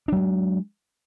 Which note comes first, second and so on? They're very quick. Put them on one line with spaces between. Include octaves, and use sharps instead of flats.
D4 F#3 G#3